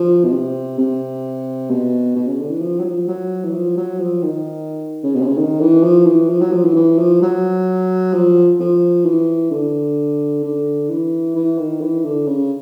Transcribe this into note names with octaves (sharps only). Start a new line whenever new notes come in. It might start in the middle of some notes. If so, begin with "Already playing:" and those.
Already playing: F3
B2
C3
C3
B2
B2
C#3
D3
E3
F3
F#3
F3
F#3
E3
F3
F#3
F3
D#3
C#3
B2
C3
C#3
D#3
E3
F3
E3
F3
F#3
F3
E3
E3
F3
F#3
F3
F3
E3
D3
D3
E3
E3
D#3
E3
D3
C#3